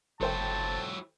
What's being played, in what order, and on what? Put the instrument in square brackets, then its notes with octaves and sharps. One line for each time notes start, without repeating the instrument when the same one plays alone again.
[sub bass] F#1 [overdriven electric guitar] F#3 E4 [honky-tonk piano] A4 C5 G5 [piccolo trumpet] A5